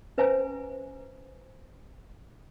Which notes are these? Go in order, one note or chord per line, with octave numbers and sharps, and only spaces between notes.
C#4 B4 C5 E5 G#5 A#5